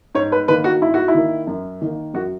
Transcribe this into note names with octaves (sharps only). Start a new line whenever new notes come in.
G#2 C#5
B4
D#3 A#3 B4
F#4
G#2 E4
F#4
E4
D#3 A#3
F#2
D#3 A#3
F#2 F#4